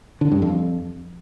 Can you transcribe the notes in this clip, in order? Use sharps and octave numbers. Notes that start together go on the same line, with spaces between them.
D3
G2
F2